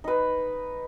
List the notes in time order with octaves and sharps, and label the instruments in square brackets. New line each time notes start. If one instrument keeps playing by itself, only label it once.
[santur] D#4 B4